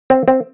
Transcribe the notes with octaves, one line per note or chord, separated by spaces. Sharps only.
C4
C4